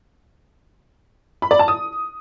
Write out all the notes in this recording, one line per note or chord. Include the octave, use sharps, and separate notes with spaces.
B5
D5
A5
D#6